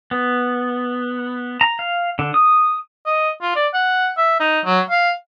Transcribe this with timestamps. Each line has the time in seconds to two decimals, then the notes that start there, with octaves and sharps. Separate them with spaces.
0.11 B3
1.61 A#5
1.79 F5
2.19 D3
2.34 D#6
3.06 D#5
3.42 F4
3.56 D5
3.74 F#5
4.17 E5
4.40 D#4
4.65 F#3
4.90 F5